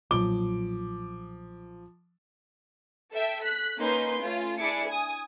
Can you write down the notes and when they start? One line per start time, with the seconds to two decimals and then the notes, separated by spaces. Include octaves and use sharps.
0.11 B1 A#2 F3 F#3 D6 G7
3.13 A4 E5 G5
3.43 F#6 B6
3.78 A#3 C#4 D#4 B4 C6 G6
4.23 A3 C#4 F4
4.58 D4 E4 G#4 D6 C#7
4.88 G#5 D#6